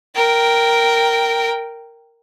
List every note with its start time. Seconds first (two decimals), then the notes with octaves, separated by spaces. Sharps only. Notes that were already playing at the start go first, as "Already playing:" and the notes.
0.15 A#4 G5